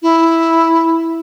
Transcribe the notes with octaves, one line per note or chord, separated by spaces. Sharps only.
E4